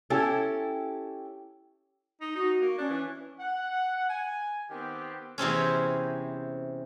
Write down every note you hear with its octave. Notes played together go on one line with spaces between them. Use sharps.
C#4 E4 G4 A4
D#4
D#4 F#4
A#3
C#4 D4
E3
F#5
G#5
D#3 B3 C4 G4
E2 C3 C4 C#4